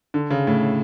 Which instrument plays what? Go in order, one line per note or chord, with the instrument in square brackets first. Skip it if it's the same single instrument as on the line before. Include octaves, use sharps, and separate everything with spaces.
[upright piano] D3
C#3
A2